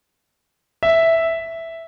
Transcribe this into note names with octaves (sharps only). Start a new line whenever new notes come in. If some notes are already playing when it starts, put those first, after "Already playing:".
E5